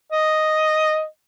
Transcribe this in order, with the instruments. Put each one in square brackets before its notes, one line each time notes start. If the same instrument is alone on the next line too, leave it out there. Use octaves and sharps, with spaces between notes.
[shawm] D#5